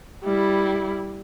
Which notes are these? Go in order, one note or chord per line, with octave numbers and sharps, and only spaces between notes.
G3 E4